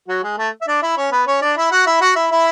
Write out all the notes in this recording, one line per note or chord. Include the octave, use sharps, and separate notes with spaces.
F#3 F#4
G#3 G#4
A3 A4
E5
D4 D5
E4 E5
C#4 C#5
B3 B4
C#4 C#5
D4 D5
E4 E5
F#4 F#5
E4 E5
F#4 F#5
E4 E5
E4 E5